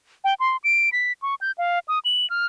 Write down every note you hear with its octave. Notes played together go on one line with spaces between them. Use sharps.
G5
C6
D7
B6
C#6
G6
F5
D#6
F#7
F6